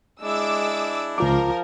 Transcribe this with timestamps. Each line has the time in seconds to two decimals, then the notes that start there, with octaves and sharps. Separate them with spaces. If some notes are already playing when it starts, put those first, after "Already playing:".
0.22 G#3 D4 E4 D6 E6
1.18 C#2 F3 F4 A#4 D6